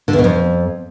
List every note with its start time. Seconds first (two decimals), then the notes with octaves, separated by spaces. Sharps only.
0.08 D3
0.13 E2
0.19 B2
0.24 F2